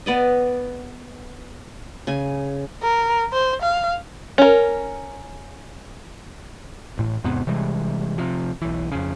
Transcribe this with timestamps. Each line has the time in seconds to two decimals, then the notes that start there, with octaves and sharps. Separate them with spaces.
0.06 B3 D5 D#5
2.07 C#3 G#5
2.83 A#4
3.33 C5
3.62 F5
4.38 C#4 A#4
6.98 A1 A2
7.24 E2 G#2 C3 B3
7.47 C3 E3 G3 G#3
8.18 C3 F3
8.62 B1 E3
8.92 F2 C#3